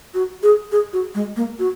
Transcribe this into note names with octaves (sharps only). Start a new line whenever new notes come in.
F#4
G#4
G#4
F#4
G#3
A#3
F#4